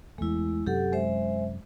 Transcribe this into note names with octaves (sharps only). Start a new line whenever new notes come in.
E2 G#3 A3 E4
F#2 C3 F#3 G4 A4 F#5
G#3 C5 E5